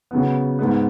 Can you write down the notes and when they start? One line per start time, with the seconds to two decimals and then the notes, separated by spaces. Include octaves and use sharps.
0.11 C#3 F#3 B3
0.59 G#2 G#3 B3